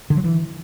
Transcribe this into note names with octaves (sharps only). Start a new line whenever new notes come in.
D3
F#3
E3